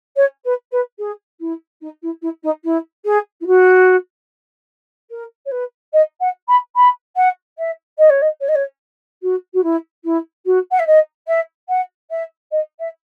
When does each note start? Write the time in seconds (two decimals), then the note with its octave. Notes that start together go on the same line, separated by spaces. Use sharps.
0.16 C#5
0.44 B4
0.71 B4
0.98 G#4
1.40 E4
1.81 D#4
2.02 E4
2.22 E4
2.43 D#4
2.64 E4
3.05 G#4
3.41 E4
3.46 F#4
5.10 A#4
5.46 C#5
5.51 B4
5.93 D#5
6.20 F#5
6.48 B5
6.76 B5
7.16 F#5
7.58 E5
7.98 D#5
8.09 C#5
8.21 D#5
8.40 C#5
8.48 D#5
8.55 C#5
9.22 F#4
9.54 F#4
9.63 E4
10.04 E4
10.45 F#4
10.71 F#5
10.79 E5
10.86 D#5
11.27 E5
11.69 F#5
12.10 E5
12.51 D#5
12.79 E5